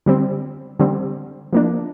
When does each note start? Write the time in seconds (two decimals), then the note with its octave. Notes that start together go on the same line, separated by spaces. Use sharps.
0.06 D3 G3 C4
0.79 D3 G3 C4
1.53 F3 A#3 D4